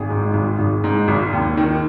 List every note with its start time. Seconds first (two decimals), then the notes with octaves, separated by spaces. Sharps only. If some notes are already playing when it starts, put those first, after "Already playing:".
Already playing: G#1 G#4
0.10 G#2
0.34 G#1
0.59 G#1
0.84 G#2
1.08 G#1
1.33 D#2
1.57 D#3